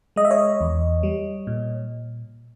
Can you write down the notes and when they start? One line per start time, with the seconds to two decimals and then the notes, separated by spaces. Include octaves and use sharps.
0.16 G#3 D#5
0.25 E5
0.31 C#5 D#5
0.61 E2
1.03 G3
1.47 A#2